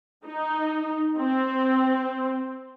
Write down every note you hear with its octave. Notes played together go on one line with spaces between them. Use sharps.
D#4
C4